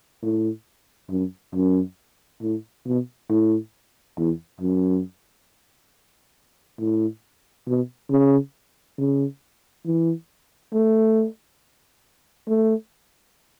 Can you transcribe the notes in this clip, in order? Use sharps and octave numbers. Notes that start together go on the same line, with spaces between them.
A2
F#2
F#2
A2
B2
A2
E2
F#2
A2
B2
C#3
C#3
E3
A3
A3